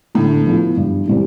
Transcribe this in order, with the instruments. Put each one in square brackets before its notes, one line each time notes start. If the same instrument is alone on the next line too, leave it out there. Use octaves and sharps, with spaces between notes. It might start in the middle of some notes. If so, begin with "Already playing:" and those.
[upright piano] A2 [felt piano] D3
[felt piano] F3 B3 E4
G2
E3 G3 C4